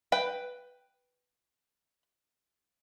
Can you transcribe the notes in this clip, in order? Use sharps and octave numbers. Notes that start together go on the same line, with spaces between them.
B4 G5